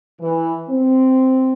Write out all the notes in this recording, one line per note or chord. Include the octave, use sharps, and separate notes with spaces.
E3
C4